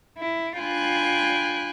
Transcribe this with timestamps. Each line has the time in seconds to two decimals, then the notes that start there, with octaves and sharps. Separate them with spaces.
0.19 E4
0.58 D4 F4 G5 G#5 B5 F#6